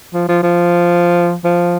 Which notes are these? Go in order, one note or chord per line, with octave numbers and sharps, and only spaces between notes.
F3
F3
F3
F3